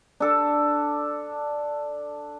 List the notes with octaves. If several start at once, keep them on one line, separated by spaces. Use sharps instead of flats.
D4 A4 A5